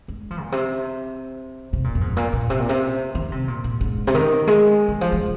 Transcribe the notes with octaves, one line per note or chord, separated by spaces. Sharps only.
G#3
F3
A#2
C3
C3
A#2
F2
G#2
A#2
A#2
C3
A#2
C3
D#3
C3
A#2
A#2
G#2
C3
D#3
G#3
D#3
F3
G#3
C3